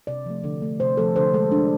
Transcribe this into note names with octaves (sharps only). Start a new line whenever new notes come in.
C3 D5
F3 A3
D3
A3
C3 C5
F3 A3 A4
D3 C5
G#3 A4
D3 D4